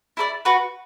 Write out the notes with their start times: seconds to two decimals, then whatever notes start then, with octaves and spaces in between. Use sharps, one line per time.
0.17 E4 A4 D5
0.45 F#4 B4 F#5